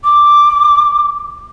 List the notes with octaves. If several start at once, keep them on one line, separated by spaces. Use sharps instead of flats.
D6